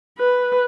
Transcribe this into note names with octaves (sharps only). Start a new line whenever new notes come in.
B4